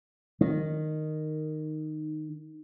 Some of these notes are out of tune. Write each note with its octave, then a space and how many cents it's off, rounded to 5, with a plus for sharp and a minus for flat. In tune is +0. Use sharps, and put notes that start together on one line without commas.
D#3 -10